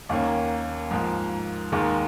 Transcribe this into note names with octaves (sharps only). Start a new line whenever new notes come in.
D#2 D#3 A#3 C#4
G#2 F3 A#3
D#2 D#3 G#3